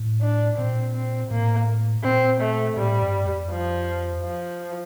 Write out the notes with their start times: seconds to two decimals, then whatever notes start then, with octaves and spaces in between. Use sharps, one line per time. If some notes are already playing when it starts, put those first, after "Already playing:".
Already playing: A2
0.21 D4
0.58 A#2 C4
0.94 C4
1.31 A2 A#3
2.04 A#2 C4
2.40 A3
2.77 A2 G3
3.02 G2
3.26 F2
3.51 F3
4.23 F3